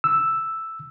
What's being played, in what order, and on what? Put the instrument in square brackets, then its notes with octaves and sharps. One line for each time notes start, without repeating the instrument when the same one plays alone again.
[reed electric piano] E6